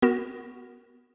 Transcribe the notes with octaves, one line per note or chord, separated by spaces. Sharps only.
B3 F#4 A#4 A#6 E7